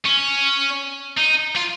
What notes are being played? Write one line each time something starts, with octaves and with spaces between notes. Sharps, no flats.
C#4
D#4
F4